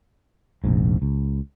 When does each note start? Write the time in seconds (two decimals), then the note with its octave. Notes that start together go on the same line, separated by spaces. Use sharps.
0.64 F1 A#1 G#2
1.02 C#2